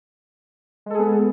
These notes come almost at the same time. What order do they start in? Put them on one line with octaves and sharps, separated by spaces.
G#3 A4 G#4 B3